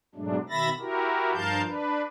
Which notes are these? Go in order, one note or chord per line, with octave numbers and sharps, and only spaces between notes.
G#2 B2 F#3 G#3 A3 D4
B2 D#3 E5 B5 A6 A#6
E4 F#4 G4 A#4
G2 F3 A#4 F5 A5 G6
D4 B4